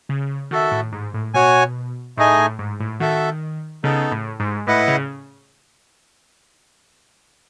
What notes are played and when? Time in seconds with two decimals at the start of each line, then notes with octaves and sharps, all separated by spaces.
0.09 C#3
0.51 D#3 F#4 A4 E5
0.72 A2
0.92 G#2
1.14 A2
1.34 B2 F#4 C#5 G#5
2.17 A2 A3 D#4 G#4 D#5 G#5
2.38 A2
2.59 G#2
2.80 A2
3.00 D#3 F#4 A4 E5
3.84 C#3 B3 D#4 A4
4.11 A2
4.40 G#2
4.67 A2 E4 B4 D#5 F#5
4.88 C#3